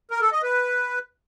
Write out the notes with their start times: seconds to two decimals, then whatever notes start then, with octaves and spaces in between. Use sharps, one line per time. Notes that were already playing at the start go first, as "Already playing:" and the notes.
0.11 A#4
0.22 A4
0.32 D#5
0.43 B4